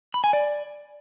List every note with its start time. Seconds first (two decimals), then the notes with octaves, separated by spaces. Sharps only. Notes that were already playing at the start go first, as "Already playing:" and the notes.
0.14 B5
0.24 G#5
0.33 D5